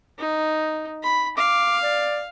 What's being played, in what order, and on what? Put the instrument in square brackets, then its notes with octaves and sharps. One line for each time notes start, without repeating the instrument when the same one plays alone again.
[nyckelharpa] D#4
B5
[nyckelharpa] F5 [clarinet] D6
[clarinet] D5